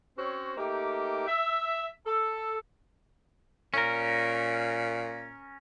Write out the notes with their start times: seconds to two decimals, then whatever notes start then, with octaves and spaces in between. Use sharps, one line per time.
0.18 C4 C#4 F#4 C5 C#5
0.56 A3 A#3 D#4 G4
1.27 E5
2.06 A4
3.74 A#2 C#4 A#4